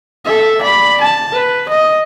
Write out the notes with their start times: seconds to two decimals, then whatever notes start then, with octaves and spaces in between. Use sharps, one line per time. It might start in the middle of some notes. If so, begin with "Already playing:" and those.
0.26 A4 E5
0.61 D5 B5
1.01 A5
1.33 B4
1.69 D#5